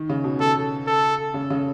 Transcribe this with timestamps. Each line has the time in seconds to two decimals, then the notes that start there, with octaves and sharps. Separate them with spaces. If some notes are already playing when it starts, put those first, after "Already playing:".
Already playing: D#3
0.10 C#3
0.24 B2
0.40 C#3 A4
0.87 A4
1.34 C#3
1.50 C#3